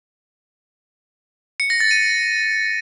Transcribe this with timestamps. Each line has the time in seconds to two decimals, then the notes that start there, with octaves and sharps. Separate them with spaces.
1.60 C#7
1.70 A#6
1.80 A6
1.91 D#7